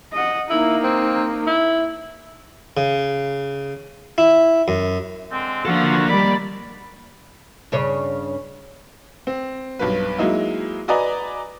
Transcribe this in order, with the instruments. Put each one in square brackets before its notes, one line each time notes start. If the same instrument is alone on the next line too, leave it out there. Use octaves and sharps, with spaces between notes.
[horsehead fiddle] D#5 F#5
[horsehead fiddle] A#3 D#4 [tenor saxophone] E4
[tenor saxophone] C4
E4
[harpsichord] C#3
E4
F#2
[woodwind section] D3 G#3 C4
[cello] F3 [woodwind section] A3 F4 F#4 [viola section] A#3 [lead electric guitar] D4 A4
[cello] D#3 G3 [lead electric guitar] D5 [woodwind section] B5
[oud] G2 C#3 C#5
[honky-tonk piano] C4
B1 G2 B4
F#3 G#3 A#3 D#4 E4
F#4 B4 D5 D#5 G#5 A#5